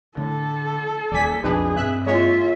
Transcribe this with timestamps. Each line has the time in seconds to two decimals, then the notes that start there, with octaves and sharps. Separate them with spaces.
0.17 A2 D3 A4
1.12 D#1 D#2 G3 D5 G#5 B6
1.43 B1 F2 B2 D4 D#4 G#4 B4
1.76 G2 C4 E5 F#6
2.06 G#3 A#3 F4 C#5 E5